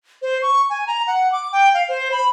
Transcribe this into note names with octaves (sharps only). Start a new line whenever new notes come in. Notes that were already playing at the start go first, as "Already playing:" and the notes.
C5
C#6
G#5
A#5
F#5
D6
G5
F5
C5
B5